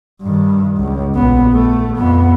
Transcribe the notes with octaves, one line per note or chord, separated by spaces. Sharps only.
G2 D#3
C#2
A#1 B3
A3
F2 B3